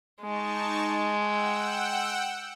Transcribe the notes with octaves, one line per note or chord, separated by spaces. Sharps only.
G#3 D#4 A5 C#6
F#5 G5 E6